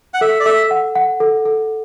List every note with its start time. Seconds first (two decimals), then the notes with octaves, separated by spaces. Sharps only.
0.14 F#5
0.21 A4 E5
0.40 D5
0.46 A4 E5
0.71 F#5
0.96 F#5
1.20 A4
1.45 A4